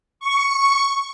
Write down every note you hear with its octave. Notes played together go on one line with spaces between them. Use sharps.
C#6